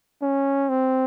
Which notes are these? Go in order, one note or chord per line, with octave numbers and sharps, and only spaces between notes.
C#4
C4